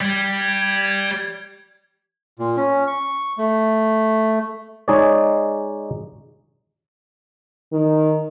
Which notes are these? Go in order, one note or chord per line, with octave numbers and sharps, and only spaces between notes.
G3 G#6
A#2
C#4
C#6
A3
G#3 D#4 G#4 C#5 D5
D#3